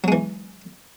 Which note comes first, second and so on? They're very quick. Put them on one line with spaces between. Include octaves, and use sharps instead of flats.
F#3 G#3 E3